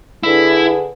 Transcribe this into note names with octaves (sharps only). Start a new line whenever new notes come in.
D3 E4 G#4 B4